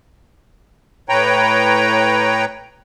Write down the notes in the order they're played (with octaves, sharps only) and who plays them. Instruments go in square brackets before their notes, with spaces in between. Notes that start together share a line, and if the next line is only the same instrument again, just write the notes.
[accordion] A2 B4 C#5 G5 A#5